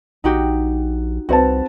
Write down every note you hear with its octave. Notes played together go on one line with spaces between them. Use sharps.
A#1 D#4 F#4 G4
C2 C4 F#4 B4 A5